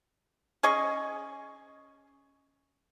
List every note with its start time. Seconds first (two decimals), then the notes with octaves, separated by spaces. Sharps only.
0.63 C#4 G#4 D#5 C#6